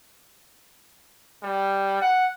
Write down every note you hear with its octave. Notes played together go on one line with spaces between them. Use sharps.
G3
F#5